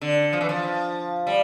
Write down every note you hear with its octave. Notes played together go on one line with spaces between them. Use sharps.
D3
F3
E3
F3
G3